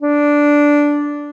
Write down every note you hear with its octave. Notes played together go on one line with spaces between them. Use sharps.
D4